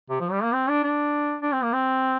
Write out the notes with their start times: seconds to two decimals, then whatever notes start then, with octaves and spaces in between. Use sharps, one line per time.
0.10 C3
0.20 F3
0.31 G3
0.43 A#3
0.54 C4
0.69 D4
0.83 D4
1.42 D4
1.52 C4
1.63 A#3
1.73 C4